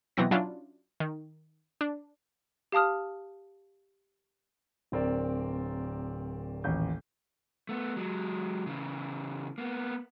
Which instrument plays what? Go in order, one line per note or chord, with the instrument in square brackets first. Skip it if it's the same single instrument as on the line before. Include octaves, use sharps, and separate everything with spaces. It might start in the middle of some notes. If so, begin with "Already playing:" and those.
[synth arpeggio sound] B2 E3 F#3 C4 A#6
F#3 C#4 D4 E4 F4
D#3
D4
[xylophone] G4 F5 A5 D#6 F6
[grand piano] D1 C4 A#4 D5
D#1 A1 G6
[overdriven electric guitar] A3 B3
F#3 G#3
C#3 E3
A#3 B3